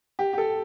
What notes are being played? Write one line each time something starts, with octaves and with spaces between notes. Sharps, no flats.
G4
G4
A4